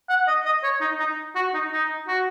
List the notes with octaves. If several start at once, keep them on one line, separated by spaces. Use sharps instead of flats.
F#5
D#5
D#5
C#5
D#4
D#4
F#4
D#4
D#4
F#4